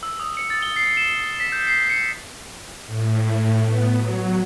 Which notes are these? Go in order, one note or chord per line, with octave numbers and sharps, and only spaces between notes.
E6
D#6
C#7
A6
G7
C7
E7
G7
B6
G6
C7
C#7
A2
B3
F#3